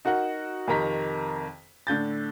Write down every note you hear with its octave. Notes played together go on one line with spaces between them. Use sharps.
D#4 F#4 A#4 F#5
F2 C3 D#3 A#5 B6
A2 D3 G6 A6